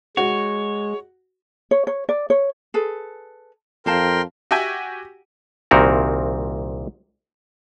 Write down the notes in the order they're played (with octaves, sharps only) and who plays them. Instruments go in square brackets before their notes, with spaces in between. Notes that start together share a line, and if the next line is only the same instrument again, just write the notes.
[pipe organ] G#3 [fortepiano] F#4 [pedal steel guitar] C#5
[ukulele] C#5
C#5
D5
C#5
G#4 A4 B4
[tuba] F2 [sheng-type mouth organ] A#4 G5 C6 [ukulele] C5 F5 A5
[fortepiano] F#4 G4 E5 G5 G#5
[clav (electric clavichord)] C2 A#2 D#3 C4 F#4 A#4